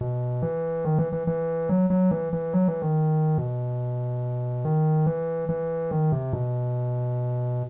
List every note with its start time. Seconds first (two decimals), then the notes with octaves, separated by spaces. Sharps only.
0.01 B2
0.42 E3
0.85 D#3
0.98 E3
1.12 E3
1.27 E3
1.69 F#3
1.90 F#3
2.11 E3
2.33 E3
2.53 F#3
2.68 E3
2.82 D#3
3.38 B2
4.65 D#3
5.06 E3
5.49 E3
5.91 D#3
6.12 C3
6.33 B2